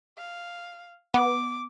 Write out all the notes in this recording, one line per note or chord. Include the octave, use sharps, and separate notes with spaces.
F5
B3 D6